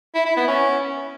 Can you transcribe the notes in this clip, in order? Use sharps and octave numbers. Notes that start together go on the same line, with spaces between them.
E4
E4
B3
C#4